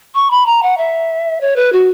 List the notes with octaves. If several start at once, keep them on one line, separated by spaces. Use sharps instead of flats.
C#6
B5
A#5
F#5
E5
C#5
B4
F#4